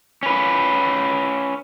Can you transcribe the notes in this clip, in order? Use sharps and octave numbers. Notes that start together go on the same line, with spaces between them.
C#4 B4